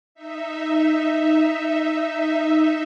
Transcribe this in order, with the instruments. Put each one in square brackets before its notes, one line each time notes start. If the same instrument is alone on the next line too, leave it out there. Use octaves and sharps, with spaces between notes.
[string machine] D#4 E5